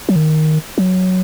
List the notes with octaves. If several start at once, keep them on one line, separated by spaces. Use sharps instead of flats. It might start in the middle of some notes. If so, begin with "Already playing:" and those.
F#3
D#3
F#3